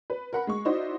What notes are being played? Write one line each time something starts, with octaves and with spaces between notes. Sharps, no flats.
B4
A#4 F#5 B5
G#3 C#6
D#4 E4 F#4 C5 D5 D#5